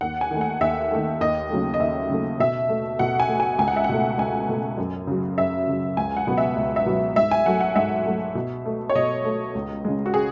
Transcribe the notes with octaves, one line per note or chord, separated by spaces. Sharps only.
D#2 F#5
G#5
D#3 A3
F#5
D#2 E5
D#3 A3
D#2 D#5
C#3 F#3 A3
D#5
D#2 E5
C#3 F#3 A3
B2 E5
A3
B2 F#5
G#5
A3
G#5
C#2 G#5
F#5
E5
F#5
B2 A3
C#2 G#5
B2 A3
F#2
C#3 F#3
F#2 E5
C#3 F#3
C#2 G#5
F#5
B2 F#3 B3
E5
C#2
E5
B2 F#3 B3
G#2 E5
G#5
F#3 A3 F#5
F#5
G#2 E5
F#3 A3
B2
A3
C#5
B2 D#5
A3
C#2
C#3 G#3
F#4
G#4